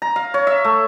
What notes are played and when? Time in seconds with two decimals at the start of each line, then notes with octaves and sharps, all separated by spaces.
0.02 A#5
0.16 F5
0.34 C#5
0.47 E5
0.64 A3